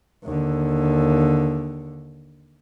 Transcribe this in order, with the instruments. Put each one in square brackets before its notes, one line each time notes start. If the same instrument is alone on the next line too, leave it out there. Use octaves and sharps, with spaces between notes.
[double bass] D#2 D3